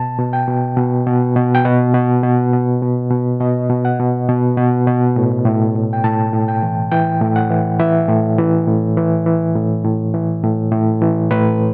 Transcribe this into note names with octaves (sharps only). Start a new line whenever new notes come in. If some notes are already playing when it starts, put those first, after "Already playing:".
Already playing: B2 A5
B2
G5
B2
B2
B2
B2
G5
B2 F#5
B2
B2
B2
B2
B2
B2 D#5
B2
F#5
B2
B2
B2
B2
A2
A2
A2
G5
A2 A5
A2
G5
E3
E3 G5
A2
F#5
E3
E3 E5
A2
E3
A2
E3
E3
A2
A2
E3
A2
A2
E3
A2 B4